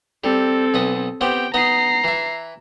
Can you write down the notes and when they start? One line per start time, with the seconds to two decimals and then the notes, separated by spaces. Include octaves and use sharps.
0.24 G3 C4 A4
0.74 B1 B4 D#5
1.21 B3 C4 G4 G5
1.54 B3 D#4 D#5 A#5 C7
2.04 E3 E5